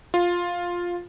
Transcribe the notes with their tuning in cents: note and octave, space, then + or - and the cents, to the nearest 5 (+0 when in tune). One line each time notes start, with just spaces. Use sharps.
F4 +5